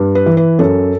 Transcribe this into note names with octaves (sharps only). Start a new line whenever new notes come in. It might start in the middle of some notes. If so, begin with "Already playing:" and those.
Already playing: G2
B4
E3
B4
F#2 A4